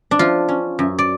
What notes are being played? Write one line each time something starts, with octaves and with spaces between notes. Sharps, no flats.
D4
F3 F4
C#4
F#2
D5